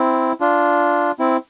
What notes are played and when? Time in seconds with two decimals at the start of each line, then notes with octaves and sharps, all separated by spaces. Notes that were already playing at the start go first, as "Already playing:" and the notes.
Already playing: C4 E4
0.40 D4 F4
1.19 C4 E4